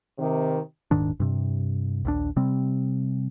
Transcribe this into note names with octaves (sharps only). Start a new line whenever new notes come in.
C3 D#3
D#1 G#2 D#3 D4
G2 C3
A#1 D#2 D4
C3 G3 C4